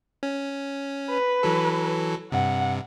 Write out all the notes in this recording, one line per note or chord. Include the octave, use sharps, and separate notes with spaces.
C#4
B4
E3 F#3 A4
G2 C3 F#5